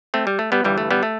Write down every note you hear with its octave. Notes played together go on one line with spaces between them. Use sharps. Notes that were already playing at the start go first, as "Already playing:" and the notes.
A3 C4
G3
A3
G3 B3
G1 G2 E3 G3
A3
G3 B3
A3